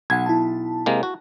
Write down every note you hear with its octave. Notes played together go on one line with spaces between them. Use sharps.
B1 F#5 G#6
E4 A5
C3 G#3 A#3
F#4